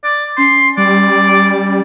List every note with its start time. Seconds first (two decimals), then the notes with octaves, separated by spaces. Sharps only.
0.04 D5
0.38 C#4 C6
0.78 G3 D5